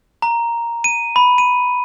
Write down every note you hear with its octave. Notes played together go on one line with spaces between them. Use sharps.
A#5
D#7
B5
D#7